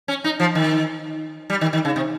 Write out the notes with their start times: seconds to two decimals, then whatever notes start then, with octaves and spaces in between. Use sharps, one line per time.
0.08 C#4
0.24 D#4
0.40 F3
0.55 D#3
1.50 G3
1.61 D#3
1.73 D#3
1.85 C#3
1.96 C3